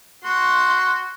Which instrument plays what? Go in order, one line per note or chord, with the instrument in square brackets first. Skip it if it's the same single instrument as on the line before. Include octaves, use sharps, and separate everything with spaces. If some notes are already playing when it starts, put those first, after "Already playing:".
[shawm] F#4 [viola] C6